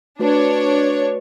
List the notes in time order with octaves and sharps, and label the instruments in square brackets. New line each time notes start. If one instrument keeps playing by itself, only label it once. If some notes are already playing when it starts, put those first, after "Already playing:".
[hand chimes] A3 F#4 B4 [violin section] D4 C#5